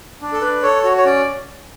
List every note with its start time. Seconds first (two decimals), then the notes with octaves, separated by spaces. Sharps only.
0.22 D4
0.33 A4
0.41 D4 B4
0.62 A4 C#5
0.83 F#4 C#5
0.97 C#5
1.05 C#4 D5